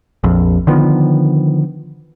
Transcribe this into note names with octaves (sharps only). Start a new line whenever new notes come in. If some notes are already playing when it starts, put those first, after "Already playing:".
A#1 F2
D3 D#3 F3 B3